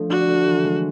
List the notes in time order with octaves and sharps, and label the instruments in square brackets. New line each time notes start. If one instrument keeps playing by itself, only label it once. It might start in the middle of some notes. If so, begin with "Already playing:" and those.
Already playing: [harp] D3 F3 A3
[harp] D4 [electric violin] F#4
[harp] A3
E3
G#3